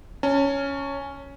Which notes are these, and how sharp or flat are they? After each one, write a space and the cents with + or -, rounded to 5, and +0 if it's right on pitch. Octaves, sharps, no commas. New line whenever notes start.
C#4 +5 A5 +35